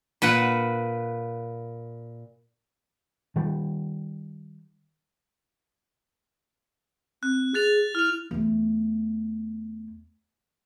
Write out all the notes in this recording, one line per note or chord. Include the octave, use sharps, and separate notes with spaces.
A#2 B4 F#5
D#3 G3
C4 F#6
G#4 F#6 A6 F7
E4 F6 F7
E2 A3